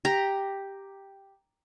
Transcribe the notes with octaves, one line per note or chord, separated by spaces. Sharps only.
G4 A#5